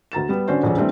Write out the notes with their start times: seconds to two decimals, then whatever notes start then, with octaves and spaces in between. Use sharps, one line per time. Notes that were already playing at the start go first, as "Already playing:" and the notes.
0.12 D2 A#5 A6 E7
0.29 G3 B3
0.48 D3 C#4 D4 F#4 C5
0.63 D#1 F2 C#3 C#4 D4
0.77 E3 G3 A3 C4 D4 A4